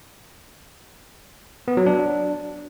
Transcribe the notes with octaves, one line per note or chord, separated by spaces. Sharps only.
B3
F#3
D4